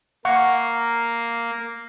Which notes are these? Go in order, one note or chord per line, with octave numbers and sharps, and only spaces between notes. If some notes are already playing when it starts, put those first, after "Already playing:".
A#3 F5 F#5 C#6